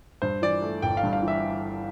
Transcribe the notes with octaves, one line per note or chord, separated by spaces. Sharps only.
G2 C5
E3 D5
A3
G1 G5
F5
G2
F5
E3
E5